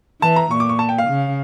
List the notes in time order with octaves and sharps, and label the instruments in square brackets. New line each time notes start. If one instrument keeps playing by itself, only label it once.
[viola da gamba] E3 [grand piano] A5
[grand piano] A#5
[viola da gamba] A#2 [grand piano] C#6
[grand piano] D6
C#6
A5
G5
F5
[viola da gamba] C#3